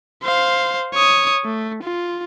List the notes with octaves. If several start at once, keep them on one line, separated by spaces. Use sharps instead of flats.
C5 F5
C#5 D#6
A3
F4